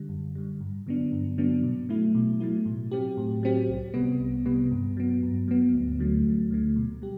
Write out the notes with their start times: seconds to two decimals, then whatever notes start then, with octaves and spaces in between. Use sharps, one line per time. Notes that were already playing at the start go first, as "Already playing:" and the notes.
Already playing: D3 G3
0.09 F#2
0.35 D3 G3
0.61 G2
0.87 D3 F#3 B3 D4
1.12 G2
1.38 D3 F#3 B3 D4
1.63 B2
1.89 F#3 A3 E4
2.15 B2
2.40 F#3 A3 E4
2.66 A2
2.91 F#3 C4 G4
3.17 A2
3.43 F#3 C4 G4
3.68 C2
3.94 C3 G3 B3
4.20 C2
4.45 C3 G3 B3
4.71 G2
4.97 F#3 B3
5.23 G2
5.48 F#3 B3
5.74 D2
5.99 D3 F#3 A3
6.25 D2
6.51 D3 F#3 A3
6.76 B2
7.02 G3 G4